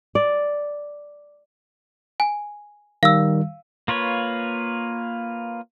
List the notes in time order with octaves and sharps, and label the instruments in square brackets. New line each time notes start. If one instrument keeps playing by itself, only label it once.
[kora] D5
[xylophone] G#5
[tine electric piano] D#3 G3 [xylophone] F5 E6
[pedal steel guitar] A#3 F4 B4 C#5